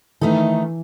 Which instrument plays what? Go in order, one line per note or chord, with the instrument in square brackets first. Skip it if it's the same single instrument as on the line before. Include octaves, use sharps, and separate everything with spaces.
[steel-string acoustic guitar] D#3 A3 D#4 A4 [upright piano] E3